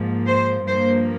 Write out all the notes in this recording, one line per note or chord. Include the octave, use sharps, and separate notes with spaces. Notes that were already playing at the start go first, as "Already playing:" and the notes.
Already playing: G#2 F3 A#3
C5
G2 F3 A#3 C5